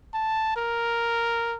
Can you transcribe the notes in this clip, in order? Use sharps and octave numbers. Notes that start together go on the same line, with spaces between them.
A5
A#4